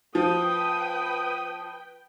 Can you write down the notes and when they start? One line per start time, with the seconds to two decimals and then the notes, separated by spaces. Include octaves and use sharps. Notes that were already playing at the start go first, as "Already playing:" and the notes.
0.15 F3 B4 G5 D#6